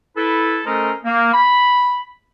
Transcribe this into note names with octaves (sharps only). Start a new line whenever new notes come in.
E4 A4 B4
A3 C#4 A4 A#4 C5 D#5
A#3
B5